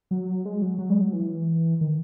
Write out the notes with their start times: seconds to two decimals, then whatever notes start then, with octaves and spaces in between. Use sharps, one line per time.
0.11 F#3
0.45 G#3
0.62 F#3
0.78 F#3
0.90 G#3
1.01 F#3
1.13 E3
1.81 D#3